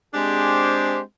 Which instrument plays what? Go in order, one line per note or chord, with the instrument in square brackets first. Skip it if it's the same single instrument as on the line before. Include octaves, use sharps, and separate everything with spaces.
[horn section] G#3 C4 D4 G4 G#4 C5